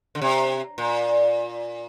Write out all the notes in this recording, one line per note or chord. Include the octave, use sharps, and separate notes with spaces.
D3
C3
A#2